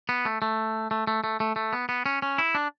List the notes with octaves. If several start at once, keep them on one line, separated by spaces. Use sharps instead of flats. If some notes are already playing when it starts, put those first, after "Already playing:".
B3
A3
A3
A3
A3
A3
A3
A3
B3
B3
C#4
C#4
E4
D4